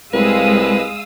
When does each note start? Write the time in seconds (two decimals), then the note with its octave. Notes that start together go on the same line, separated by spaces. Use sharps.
0.14 C2 G#3 B4 F5 D#6 E6